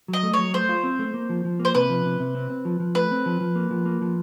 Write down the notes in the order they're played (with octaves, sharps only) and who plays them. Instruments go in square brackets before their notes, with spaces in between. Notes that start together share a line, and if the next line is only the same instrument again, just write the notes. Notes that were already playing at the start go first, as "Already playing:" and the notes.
[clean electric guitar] F#3
[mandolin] D#5
[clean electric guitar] A3
[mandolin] C#5
[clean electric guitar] F#3
[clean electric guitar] A3 [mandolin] C5
[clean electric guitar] F4
C4
A3
A#3
F3
F3
A#3
[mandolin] C5
[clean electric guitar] C3 [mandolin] B4
[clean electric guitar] F3
C3
C3
C4
C4
F3
F3
[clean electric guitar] A3 [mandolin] B4
[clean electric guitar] C4
F3
F3
A#3
F3
A#3
F3